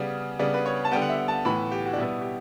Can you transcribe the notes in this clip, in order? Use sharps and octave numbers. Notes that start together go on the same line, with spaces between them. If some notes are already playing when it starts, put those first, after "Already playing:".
Already playing: C#3 G3 B3
C#3 G3 B3 D4
B4
C#5
A5
D3 G3 B3 G5
F#5
E5
A5
A2 E3 B3 B5
G4
F#4
D4
B2 G3 B3 E4
G4